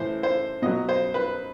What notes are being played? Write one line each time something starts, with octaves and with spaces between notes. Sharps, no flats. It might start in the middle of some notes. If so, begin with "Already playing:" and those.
Already playing: A2 E3 C5
C5
B2 F#3 D#5
C5
B4